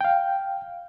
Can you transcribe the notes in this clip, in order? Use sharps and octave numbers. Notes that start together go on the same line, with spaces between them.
F5 G5